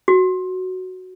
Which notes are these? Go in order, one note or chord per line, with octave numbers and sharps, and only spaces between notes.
F#4